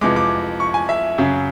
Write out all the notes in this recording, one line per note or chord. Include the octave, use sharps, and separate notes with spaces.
F2 C3 E3 G#3 D6
D6
C#6
G#5
E5
F#2 C#3 F#3